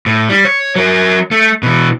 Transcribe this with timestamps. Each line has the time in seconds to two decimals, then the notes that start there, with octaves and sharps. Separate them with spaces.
0.06 A2
0.29 G3
0.45 C#5
0.75 F#3 A#4
1.31 A3
1.63 B2 E3